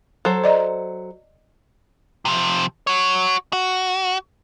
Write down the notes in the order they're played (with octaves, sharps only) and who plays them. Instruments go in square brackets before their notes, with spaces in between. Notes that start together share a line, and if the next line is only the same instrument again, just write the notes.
[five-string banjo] F#3 A4 C5
[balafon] D5 D#5 A#5
[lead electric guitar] C3 F3
F#4 C#5
F#4